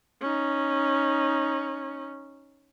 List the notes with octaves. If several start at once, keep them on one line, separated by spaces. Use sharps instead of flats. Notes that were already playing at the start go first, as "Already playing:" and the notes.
C#4 D#4